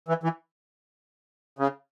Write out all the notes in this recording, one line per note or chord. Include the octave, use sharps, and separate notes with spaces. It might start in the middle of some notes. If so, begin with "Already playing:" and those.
E3
E3
C#3